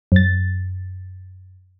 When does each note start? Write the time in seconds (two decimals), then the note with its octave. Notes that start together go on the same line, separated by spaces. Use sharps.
0.12 F#2 A6